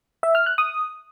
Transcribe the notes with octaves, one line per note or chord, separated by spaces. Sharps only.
E5
F6
F#6
D#6